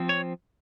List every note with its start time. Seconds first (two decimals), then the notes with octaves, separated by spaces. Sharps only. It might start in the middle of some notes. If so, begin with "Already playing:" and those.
Already playing: F3 C4
0.09 C#5